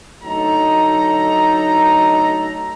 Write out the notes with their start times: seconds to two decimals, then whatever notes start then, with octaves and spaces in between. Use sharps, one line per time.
0.23 D2 F#3 D#4 A4 A#5